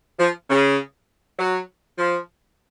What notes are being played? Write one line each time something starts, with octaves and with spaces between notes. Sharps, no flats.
F3
C#3
F#3
F3